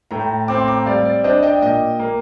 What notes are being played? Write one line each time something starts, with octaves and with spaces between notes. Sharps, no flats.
A2 G5 A#5
C4 D6
C6
A#5 D6
G3 D5 F5
D5
D4 C5 D#5
D#5 G5
A#2 D#5 G5
A#3